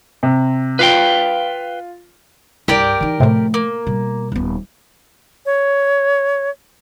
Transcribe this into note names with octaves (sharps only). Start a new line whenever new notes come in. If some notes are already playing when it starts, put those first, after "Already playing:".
C3
F4 B4 F5 G5
C2 G2 G4 A#4 D5
E3 D#4
A2 C3 F3 A3
A#3
B2 G3
D#1 B3
C#5